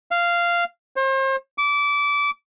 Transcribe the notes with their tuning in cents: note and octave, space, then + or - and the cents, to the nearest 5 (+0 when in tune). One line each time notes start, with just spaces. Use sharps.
F5 -10
C5 +40
D6 -25